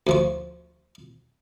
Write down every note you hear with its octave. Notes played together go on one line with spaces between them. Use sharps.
D2 F3 C#6